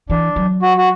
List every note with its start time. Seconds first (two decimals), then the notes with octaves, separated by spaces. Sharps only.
0.10 E3 D4
0.36 F#3
0.62 F#4
0.77 F#4